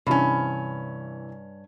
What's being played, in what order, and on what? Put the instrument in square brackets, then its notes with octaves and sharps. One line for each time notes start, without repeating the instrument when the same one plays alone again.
[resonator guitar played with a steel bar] G2 C#4 [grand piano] C3 E3